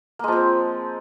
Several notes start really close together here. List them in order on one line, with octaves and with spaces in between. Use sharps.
A#3 G#3 F3 C4